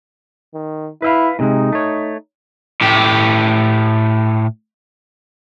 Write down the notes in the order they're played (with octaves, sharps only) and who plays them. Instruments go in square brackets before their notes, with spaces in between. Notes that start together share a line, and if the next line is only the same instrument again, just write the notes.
[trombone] D#3
[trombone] E4 [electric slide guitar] B4 E5 F5
[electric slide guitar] A2 C3 G#3 [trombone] D#4
[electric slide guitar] A3 C#5
[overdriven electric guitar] A2 G4